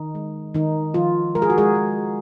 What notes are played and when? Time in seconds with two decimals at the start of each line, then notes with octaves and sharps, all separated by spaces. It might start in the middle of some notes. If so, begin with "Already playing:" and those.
Already playing: D#3 D#4
0.15 G#3
0.54 D#3 D#4
0.94 D#3 F3 F4
1.35 G#3 A#4
1.42 G#4
1.50 F#4
1.58 G#3 G#4
1.75 G#3